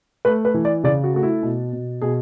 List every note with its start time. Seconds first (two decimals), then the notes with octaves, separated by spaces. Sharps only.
0.25 A3 B4
0.45 B4
0.54 E3
0.65 D5
0.84 C#3 D5
1.04 F#4
1.14 A3 F#4
1.23 E4
1.43 B2
1.73 B2
2.01 B2 G#4